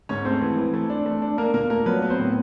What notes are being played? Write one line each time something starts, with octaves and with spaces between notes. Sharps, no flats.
G#2 C#4 C#5
A3 C4 C5
E3
E3
A3
D4
A3
D4
A#3 D4 A#4
A#2 A#3 A#4
A3 A#3 A#4
F#3 B3 B4
B3
C4 C5
A2